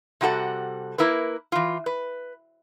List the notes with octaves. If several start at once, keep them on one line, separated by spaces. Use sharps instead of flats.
C3 G3 F#4 A4 F#5
A#3 E4 A#4 B4
E3 F4
B4